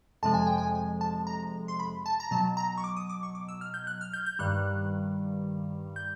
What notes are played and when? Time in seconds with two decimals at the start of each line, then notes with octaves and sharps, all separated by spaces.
0.23 F2 C3 F3 G#3 A5
0.34 G#5
0.47 G5
0.58 G#5
0.75 G#5
1.01 A5
1.27 A#5
1.68 C6
1.80 B5
2.06 A5
2.20 A#5
2.31 B2 F#3 A5
2.57 A#5
2.77 C#6
2.84 D6
2.97 D#6
3.09 D6
3.23 C#6
3.35 D6
3.48 E6
3.61 F6
3.74 G6
3.87 F#6
4.01 F6
4.13 G6
4.26 G6
4.39 G2 D#3 G3 F#6
5.96 G6